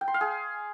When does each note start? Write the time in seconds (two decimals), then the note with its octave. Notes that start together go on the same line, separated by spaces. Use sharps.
0.01 G5
0.08 C6
0.14 F5
0.21 G#4